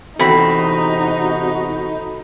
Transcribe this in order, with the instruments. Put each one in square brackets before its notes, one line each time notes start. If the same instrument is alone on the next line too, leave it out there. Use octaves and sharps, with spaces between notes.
[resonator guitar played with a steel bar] E2 C4 [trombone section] C3 F#4 [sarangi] D#4 [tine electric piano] A4 B5